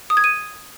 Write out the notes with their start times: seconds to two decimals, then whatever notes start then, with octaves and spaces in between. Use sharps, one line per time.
0.10 D#6
0.17 G#6
0.24 D#7